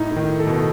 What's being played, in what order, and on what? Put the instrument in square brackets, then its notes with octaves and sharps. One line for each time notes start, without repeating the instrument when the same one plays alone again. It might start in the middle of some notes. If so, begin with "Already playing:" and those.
Already playing: [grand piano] A2 [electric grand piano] D#4
[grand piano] A2
[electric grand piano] D#3
A4
[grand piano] B2